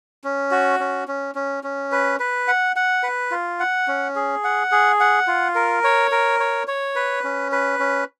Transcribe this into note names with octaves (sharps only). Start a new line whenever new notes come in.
C#4
F#4
C#4
C#4
C#4
C#4
B4
B4
F#5
F#5
B4
F4
F#5
C#4
G#4
F#5
G#4
F#5
F4
A#4
C#5
A#4
C#5
C#5
B4
C#4
B4
C#4